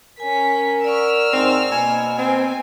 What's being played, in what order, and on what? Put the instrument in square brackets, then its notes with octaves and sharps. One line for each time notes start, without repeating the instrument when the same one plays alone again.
[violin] C#4 B6 [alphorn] A#4 [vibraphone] G#5
[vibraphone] D5 F#5 C#6 [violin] E6 F6
[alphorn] G#2 [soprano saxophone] C4
[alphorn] B2 [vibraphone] A#3 [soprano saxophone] G#5
[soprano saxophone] C4 [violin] G#5